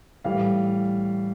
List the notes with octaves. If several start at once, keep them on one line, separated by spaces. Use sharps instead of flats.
A2 E3 G3 F5